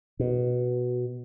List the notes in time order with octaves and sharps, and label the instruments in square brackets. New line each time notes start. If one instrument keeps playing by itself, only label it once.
[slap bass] B2